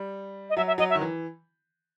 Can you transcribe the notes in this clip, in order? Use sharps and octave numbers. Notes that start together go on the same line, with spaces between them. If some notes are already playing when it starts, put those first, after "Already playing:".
Already playing: G3
D#5
F#3 E5
E5
F#3 D#5
E5
D#3
E3